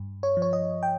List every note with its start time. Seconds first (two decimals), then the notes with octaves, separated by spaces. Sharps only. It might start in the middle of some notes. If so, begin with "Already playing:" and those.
Already playing: G2
0.23 C#5
0.37 F3
0.42 C#5
0.53 D#5
0.83 G5